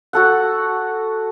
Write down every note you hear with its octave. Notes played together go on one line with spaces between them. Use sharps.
F#4 A4 F#5